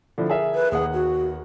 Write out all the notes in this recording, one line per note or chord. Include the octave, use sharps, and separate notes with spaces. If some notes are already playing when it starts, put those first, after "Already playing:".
D3 F3 E4
G#4 A#4 E5
B4
D#2 G#4 F#5
F#4